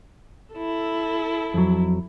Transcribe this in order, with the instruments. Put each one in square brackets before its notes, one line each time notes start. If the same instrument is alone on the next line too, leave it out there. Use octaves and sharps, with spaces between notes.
[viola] E4 A4
[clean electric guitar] F2 F#3